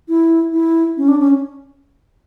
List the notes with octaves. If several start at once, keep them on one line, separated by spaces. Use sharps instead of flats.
E4
E4
C#4
D4
C#4